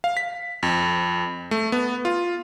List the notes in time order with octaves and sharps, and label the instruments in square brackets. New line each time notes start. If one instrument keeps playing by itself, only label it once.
[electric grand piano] F5
B6
F2
A3
B3
F4